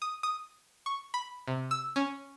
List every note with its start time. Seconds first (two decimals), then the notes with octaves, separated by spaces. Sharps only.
0.02 D#6
0.23 D#6
0.86 C#6
1.14 B5
1.47 C3
1.71 E6
1.96 C#4